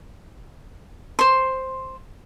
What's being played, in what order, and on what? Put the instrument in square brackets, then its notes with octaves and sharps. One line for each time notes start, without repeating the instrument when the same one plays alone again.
[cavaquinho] C5 C6